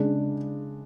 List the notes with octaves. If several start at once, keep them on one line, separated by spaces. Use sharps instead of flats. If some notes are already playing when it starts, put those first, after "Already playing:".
Already playing: C#3 G#3 D4